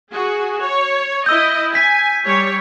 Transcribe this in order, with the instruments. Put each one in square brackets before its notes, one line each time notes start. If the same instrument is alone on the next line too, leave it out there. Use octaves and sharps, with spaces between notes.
[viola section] F#4 G#4
C#5
[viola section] E4 D#5 [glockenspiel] E6 G6
[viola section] G#5 [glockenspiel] B6
[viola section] G3 C#5